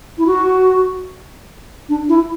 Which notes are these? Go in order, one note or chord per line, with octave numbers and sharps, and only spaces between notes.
E4
F#4
D4
E4